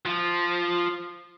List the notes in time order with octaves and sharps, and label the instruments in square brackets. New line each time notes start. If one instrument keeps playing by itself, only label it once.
[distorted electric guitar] F3